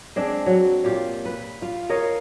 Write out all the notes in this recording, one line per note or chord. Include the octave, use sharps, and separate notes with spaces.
G#3 C4 D4
F#3
A#2 F4 G4
B4
F4
A#4 C#5 D#5 F5